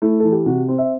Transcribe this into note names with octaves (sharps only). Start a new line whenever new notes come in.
A3 E4
E3 A4
G4
C3 F#4
C4
E5